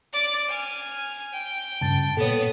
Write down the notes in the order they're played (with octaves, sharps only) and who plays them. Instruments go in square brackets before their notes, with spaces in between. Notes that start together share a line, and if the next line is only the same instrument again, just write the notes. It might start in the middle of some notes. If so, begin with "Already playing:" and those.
[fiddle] D5
G#5 F6
G5
[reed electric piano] G2 C#3 [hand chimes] A5 A6
[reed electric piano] A#2 [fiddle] B3 D#6 [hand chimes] A4 C#5